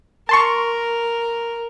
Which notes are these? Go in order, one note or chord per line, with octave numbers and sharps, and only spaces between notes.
A#4 A5 C6 C#6